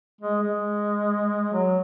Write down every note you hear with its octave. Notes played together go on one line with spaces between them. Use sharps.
G#3
G#3
F#3